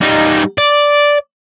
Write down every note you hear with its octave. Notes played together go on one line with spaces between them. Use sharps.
G3 D#4
D5